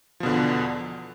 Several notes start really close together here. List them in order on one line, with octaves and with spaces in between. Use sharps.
F3 B2 D3 E2